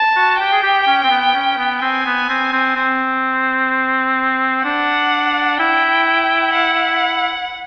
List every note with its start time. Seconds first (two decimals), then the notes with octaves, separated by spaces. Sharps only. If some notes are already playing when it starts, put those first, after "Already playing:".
Already playing: A5
0.16 F#4
0.40 G4 G5
0.52 G#4
0.63 G4
0.87 C#4
1.03 C4
1.10 B3
1.34 C#4
1.58 B3
1.82 C4 G#5
2.06 B3
2.29 C4
2.53 C4
2.76 C4
4.65 D4 F#5
5.59 E4 G5
6.54 F#5